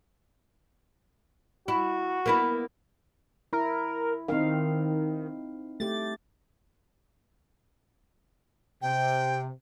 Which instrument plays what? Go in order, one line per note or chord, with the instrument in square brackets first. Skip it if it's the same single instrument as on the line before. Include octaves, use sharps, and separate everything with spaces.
[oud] E4 [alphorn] F#4
[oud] A#3 B3 E4
[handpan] E4 [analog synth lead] A#4
[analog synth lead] D#3 [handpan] C4 D#4 F5
[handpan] A3 G4 [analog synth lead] A6
[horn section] C3 [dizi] G5